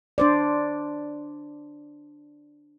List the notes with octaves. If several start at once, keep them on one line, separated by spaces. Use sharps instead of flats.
D4 C5 D5